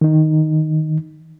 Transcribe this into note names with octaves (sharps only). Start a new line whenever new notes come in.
D#3 D#4